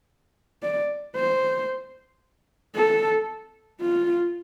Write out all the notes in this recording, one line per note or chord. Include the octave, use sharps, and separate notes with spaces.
D5
C5
A4
F4